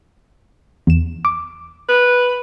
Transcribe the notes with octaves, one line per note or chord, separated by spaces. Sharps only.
E2 E7
D6
B4